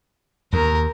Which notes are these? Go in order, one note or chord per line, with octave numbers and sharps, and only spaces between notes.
D#2 A#4